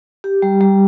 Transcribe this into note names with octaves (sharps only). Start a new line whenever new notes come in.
G4
G3
G3